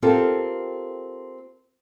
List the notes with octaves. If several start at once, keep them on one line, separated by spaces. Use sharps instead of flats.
C4 F4 G4 A4 A#4